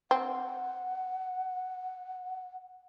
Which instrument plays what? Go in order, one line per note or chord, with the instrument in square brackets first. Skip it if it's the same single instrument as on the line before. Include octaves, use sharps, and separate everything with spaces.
[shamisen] C4 [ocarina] F#5